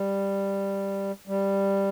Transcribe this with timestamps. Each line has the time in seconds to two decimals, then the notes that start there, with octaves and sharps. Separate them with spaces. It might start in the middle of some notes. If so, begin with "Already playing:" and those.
Already playing: G3
1.27 G3